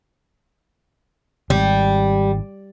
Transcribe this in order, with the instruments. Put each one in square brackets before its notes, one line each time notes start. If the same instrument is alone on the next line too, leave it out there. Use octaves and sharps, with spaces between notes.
[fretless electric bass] G#1 [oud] G3